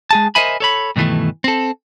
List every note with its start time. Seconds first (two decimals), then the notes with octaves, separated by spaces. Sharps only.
0.11 G#3 G#4 A5
0.35 A#4 C5 D#5 E5 G#5 B5
0.60 A4 C#5 B5
0.96 G2 B2 D#3 E3 A3
1.44 C4 A4